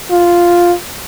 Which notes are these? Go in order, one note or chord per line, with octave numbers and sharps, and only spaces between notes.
F4